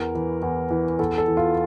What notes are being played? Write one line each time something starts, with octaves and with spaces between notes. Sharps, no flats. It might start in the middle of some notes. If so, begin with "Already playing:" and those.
Already playing: E2 A#4
E3
E2
E3
E2 A4
A4
E3
F4